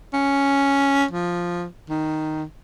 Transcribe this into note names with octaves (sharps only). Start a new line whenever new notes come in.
C#4
F3
D#3